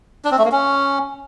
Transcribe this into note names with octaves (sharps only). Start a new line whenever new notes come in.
D4
C4
A3
A#3
C#4